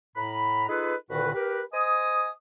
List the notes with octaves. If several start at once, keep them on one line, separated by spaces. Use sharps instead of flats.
A2 A#5 B5
D#4 F4 G#4 A4 B4
C2 A#2 D3 D#3 F#4 B4
G4 A#4 B4
C5 D#5 G#5 D#6